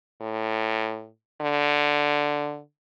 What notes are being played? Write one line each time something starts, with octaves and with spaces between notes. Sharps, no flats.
A2
D3